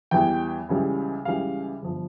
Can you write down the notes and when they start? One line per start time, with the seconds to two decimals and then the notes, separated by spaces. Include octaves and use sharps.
0.11 E2 E3 G3 G5
0.69 C#2 C#3 E3 G3
1.25 C#2 C#3 E3 G3 F5
1.82 G1 F3